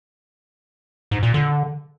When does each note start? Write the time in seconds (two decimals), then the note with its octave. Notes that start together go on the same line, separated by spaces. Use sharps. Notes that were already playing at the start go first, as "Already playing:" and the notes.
1.11 G#2
1.23 A#2
1.34 D3